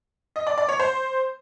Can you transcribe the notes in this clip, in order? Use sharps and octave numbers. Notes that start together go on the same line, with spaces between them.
D#5
D5
D5
C#5
C5